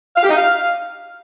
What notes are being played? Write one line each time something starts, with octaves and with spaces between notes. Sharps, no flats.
F5
G4
D#4
F5